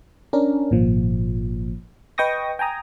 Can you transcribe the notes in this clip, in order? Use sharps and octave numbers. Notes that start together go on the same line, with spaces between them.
C#4 D4 A#4
G#1 A#2 F3
B4 D#5 G5 C#6 D#6 A#6
G5 G#5 A#5 D#6